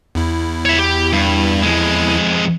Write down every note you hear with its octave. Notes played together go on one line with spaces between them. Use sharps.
E2 E4
C#5 E5
G4
G2
F2 G#3